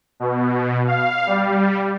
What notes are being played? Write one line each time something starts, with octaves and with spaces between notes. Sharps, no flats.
B2
F5
G3